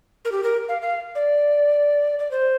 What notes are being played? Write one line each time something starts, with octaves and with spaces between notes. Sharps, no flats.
A#4
G4
A#4
F5
F5
D5
D5
C5